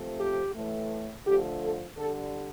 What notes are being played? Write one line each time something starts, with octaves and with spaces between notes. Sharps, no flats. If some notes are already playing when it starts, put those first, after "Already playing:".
Already playing: C3 F3 A3
G4
A2 E3 A3
D3 F3 A3 G4
A4
D3 G3 A4